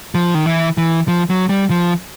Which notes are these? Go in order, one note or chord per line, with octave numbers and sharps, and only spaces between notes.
F3
D#3
E3
E3
F3
F#3
G3
F3